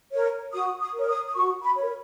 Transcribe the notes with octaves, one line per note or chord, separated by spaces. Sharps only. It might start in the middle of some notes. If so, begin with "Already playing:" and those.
A#4 C#5
F#4 D#6
D#6
A#4 C#5
D#6
D#6
F#4 C#6
B5
A#4 C#5